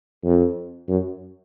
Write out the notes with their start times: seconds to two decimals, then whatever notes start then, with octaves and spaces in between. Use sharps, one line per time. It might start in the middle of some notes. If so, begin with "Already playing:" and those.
0.24 F2
0.89 F#2